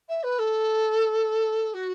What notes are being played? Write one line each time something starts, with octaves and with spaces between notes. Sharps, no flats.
E5
B4
A4
F#4